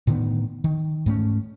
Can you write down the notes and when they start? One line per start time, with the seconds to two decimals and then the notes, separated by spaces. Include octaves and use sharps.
0.07 A2 D3 D#3 B3
0.64 D#3
1.06 G#2 A3 C#4